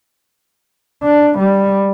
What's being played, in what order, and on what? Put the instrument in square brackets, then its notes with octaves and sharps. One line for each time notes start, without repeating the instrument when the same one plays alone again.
[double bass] D4
G3